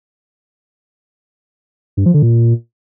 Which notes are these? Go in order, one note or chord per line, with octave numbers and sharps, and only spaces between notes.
G2
F3
D3
A#2